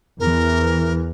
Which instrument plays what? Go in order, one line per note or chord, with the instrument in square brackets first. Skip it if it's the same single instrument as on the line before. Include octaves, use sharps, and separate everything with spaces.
[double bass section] E2 E3 [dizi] A#4